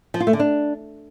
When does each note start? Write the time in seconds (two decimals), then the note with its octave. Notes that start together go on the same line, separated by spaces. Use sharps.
0.14 F3
0.20 F4
0.27 A3
0.33 D3
0.40 D4